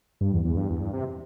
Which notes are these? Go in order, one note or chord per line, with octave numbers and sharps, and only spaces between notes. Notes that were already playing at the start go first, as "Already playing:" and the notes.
G2
E2
E2
G2
E2
G2
C3